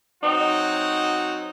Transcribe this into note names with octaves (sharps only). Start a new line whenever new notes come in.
F#3 C4 D#4 F#4